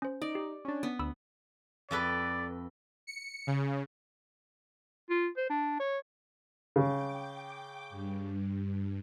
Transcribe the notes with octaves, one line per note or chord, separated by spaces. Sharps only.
C#4 C5
D#4 D5
G4
C#4 D4
B3
D2 B5 E6
F2 A4 B4 D5
C#7
C#3
F4
C5
D4
C#5
C#3 G5 D6
G2